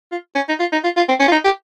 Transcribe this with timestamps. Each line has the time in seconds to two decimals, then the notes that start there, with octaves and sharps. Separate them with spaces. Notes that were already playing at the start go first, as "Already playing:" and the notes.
0.11 F4
0.35 C#4
0.48 D#4
0.59 F4
0.72 D#4
0.84 F4
0.96 F4
1.08 C4
1.20 C#4
1.28 F4
1.32 D#4
1.44 G4